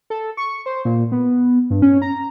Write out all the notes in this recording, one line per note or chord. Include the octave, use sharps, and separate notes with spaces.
A4
C#6
C5
A#2
B3
G2
C#4
A#5